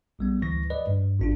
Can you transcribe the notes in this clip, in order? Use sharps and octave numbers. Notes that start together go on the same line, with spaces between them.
A#1 G3 B3
D2 E3 A#6
B4 D5 D#5
G2
G#1 D4 F4